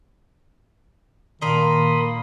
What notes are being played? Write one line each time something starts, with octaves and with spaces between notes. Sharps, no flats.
A#2 D#3 A#3 D4 A#4 B5 C6 D#6